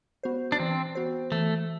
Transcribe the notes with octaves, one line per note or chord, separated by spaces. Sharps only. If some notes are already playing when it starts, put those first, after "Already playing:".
B3 F#4 C5
D4
E3 C4
B3 F#4 C5
E3 A3